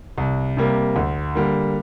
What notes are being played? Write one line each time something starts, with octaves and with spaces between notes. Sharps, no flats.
C2
C3 G3 A#3
D2
D3 G3 A#3